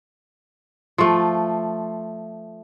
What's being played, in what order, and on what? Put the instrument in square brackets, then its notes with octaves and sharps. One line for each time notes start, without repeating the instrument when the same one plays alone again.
[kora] F3 A3